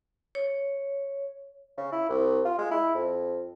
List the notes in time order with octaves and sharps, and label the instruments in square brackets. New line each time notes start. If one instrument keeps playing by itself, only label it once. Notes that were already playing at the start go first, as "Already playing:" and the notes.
[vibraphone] C#5
[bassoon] C#3
E4
C2
F4
G#3
E4
F2